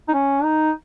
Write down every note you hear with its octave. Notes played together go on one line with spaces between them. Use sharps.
D#4
C#4
D#4